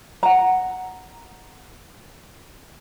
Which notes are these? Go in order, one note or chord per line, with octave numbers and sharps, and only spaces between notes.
F#5 A#5